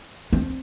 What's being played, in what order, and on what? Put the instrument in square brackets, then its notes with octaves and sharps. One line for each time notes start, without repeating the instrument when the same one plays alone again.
[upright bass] C4